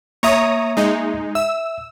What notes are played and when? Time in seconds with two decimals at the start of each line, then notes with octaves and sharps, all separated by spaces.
0.23 A#3 C#5 E5 A#5 C#6 D#6
0.77 G#3 D#4
1.35 E5 E6